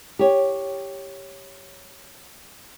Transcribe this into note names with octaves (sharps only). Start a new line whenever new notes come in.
G4 C#5